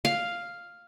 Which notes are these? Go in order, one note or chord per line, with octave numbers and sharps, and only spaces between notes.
F5